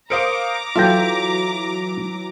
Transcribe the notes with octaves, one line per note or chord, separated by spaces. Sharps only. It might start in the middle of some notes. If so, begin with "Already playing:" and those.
A#4 C5 F5 A#5 D6 D#6 C#7 D7
E3 F#3 F4 A4 E5 G5 A#6